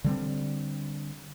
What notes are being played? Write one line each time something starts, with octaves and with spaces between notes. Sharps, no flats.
D3 G3 G#3 C4